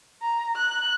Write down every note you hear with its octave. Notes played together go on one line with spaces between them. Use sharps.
A#5
F#6